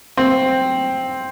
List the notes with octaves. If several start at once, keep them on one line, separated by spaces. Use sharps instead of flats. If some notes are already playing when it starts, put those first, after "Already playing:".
C4